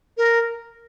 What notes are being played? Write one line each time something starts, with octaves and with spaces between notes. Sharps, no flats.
A#4